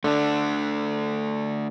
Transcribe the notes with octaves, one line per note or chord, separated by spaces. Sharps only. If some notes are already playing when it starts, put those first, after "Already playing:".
D3 A3 D4